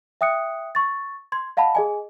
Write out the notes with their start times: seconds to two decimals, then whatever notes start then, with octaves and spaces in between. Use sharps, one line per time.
0.21 E5 G5 D#6 F#6 C#7
0.75 C#6 A6
1.32 C6 G#6
1.57 D#5 F5 F#5 A5 B5
1.75 G#4 D#5 G#5